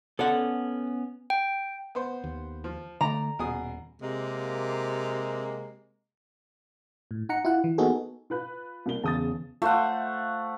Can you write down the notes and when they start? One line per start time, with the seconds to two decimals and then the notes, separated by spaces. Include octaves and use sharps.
0.19 B3 C#4 A4 D5 F#5
1.30 G5
1.95 B3 C5
2.24 D#2
2.64 F3
3.01 D3 A3 D5 A#5
3.39 D#1 B2 G#4 D#6
4.01 C3 G#3 A#3
7.11 A2
7.29 D#4 F#5 A#5 C#7
7.45 E4 F4 F#5
7.64 E3
7.78 A#3 B3 D#4 F#4 G#4 A4
8.30 F4 B4 F#6
8.86 C2 A#3 G7
9.04 E2 C#3 A5 D#6 A6
9.62 A3 F4 C5 F#5